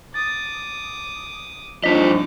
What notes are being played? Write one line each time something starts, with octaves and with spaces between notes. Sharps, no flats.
D6 D#6 A6
G2 F3 D4 D#4 D#5 D6 B6